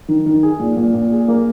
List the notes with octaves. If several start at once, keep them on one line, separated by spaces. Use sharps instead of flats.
D#3
D#3
G#4
A#2
A#2
A#2
G#4
A#3